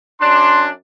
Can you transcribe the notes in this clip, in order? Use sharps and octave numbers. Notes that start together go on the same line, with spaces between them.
F#2 D4 C6